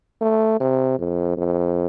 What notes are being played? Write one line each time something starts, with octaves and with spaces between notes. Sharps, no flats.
A3
C3
F2
F2